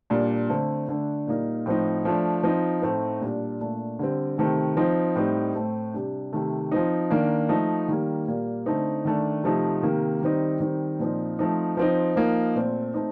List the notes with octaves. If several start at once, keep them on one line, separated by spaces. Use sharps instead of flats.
A#2 G3 D4
D3 A3 C4
D3 A3 D4
A#2 G3 A#3 D#4
A2 F3 C4 D#4
F3 A3 D4
F3 C4 D#4
A2 A3 C4 D#4
A#2 G3 D4
A#2 A3 D4
D3 G3 C4
C3 D#3 A3 C4
F3 C4 D#4
A2 G3 C4 D#4
A2 A3 C4
C3 G3 D4
C3 D#3 A3
F3 C4 D#4
D#3 A#3 D4
F3 A3 D#4
D#3 G3 A#3
A#2 G3 A#3
D3 A3 C4 D#4
D#3 A3 D4
C3 F3 A3 D#4
C3 D#3 A#3
D#3 G3 C4 D#4
D#3 G3 C4 D#4
A#2 F3 C4 D#4
F3 A3 C4 D#4
F3 C4 D#4
F3 A#3 D#4
A#2 A3 C4
A3 C4 D#4